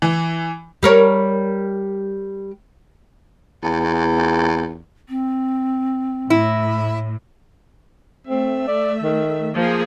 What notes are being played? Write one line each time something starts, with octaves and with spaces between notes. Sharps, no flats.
E3
G3 A#4 C#5
E2
C4
A2 E4
A3 C4 E5
D5
D#3
F3 A#3 G#4